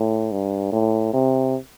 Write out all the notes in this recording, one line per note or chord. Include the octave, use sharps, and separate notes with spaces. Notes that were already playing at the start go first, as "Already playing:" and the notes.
Already playing: A2
G2
A2
C3